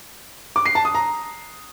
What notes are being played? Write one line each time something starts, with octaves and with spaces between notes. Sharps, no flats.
D6
C7
A5
D#6
A#5